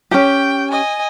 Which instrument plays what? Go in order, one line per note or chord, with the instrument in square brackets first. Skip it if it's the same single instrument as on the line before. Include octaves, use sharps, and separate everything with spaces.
[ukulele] C#4 G4 [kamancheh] G5
[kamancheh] D#5 G#5